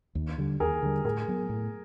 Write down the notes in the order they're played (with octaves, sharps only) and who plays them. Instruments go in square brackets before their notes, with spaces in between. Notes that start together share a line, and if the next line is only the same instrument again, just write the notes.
[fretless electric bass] D#2
D3 G3
[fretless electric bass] D#2 [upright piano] G#4 A#4
[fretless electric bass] D3 G3
[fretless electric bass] A2 [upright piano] G#4 A#4
[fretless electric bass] F#3 B3
A2